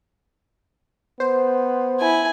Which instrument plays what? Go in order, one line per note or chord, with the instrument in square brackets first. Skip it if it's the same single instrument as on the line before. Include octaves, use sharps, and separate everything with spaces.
[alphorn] B3 [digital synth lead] C5
[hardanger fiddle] E4 G#5